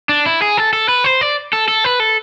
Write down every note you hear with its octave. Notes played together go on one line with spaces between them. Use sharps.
D4
E4
G#4
A4
A4
B4
C5
D5
A4
A4
B4
A4